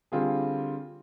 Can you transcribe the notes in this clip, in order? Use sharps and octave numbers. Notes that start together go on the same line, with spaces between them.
D3 G3 C4 F4 G#4